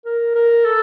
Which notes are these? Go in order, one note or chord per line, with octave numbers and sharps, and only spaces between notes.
A#4
A#4
A4